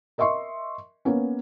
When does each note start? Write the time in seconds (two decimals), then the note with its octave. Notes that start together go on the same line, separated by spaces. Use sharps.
0.18 A#4 D#5 E5 C6 C#6
1.05 A#3 B3 C#4